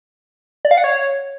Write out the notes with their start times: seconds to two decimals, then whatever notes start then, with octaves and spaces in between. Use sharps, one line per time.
0.65 D5
0.71 F5
0.77 F#5
0.84 C#5